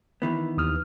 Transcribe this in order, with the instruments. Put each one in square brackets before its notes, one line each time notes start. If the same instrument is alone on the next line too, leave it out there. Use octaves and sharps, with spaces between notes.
[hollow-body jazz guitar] D#3 E3 B3
[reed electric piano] D#2 D#6 F6